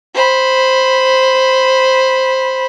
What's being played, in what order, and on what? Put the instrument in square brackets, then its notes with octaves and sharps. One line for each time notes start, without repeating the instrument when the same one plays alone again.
[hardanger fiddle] C5 B5